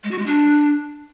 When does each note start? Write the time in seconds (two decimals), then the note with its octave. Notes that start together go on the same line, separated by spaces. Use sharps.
0.04 G#3
0.11 F#4
0.19 G#3
0.26 D4